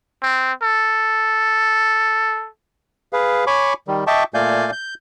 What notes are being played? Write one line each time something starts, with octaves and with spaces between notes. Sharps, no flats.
C4
A4
G#4 B4 F5
C#5 G#5 B5 C#6 D6
D#3 G3
D#5 E5 G5 A5 C#6 D6
A#2 A3 D5 F5 G#5 G6
G6